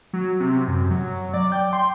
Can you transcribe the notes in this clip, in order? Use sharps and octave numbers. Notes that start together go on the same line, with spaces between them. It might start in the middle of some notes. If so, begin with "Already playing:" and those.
F#3
C3
F#2
F#3
D5
G5
C6